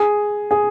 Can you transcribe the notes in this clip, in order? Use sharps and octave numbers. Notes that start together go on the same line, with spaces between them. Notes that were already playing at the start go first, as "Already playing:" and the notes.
Already playing: G#4
G#4